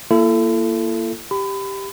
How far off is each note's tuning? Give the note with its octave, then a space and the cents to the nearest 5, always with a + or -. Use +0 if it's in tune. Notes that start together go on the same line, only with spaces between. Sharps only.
A#3 +0 E4 +40 A4 +0
G4 +0 B5 +30